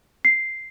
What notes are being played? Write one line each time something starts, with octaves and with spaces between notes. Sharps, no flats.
C7